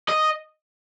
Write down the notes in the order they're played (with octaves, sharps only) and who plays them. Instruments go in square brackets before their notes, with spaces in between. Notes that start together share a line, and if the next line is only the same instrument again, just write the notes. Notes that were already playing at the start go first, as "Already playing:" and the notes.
[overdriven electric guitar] D#5